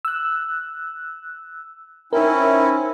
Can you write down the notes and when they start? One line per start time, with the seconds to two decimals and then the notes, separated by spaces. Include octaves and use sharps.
0.05 E6 F#6
2.13 C4 C#4 D#4 E4 A#4